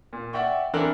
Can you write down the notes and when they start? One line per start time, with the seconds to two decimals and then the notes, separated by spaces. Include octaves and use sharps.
0.13 A#2
0.33 D5 E5 F#5 G5 C#6
0.73 E3 C4 D4 A4 A#4 F#6